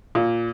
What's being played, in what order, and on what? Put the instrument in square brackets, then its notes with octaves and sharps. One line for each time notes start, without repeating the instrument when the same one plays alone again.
[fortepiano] A#2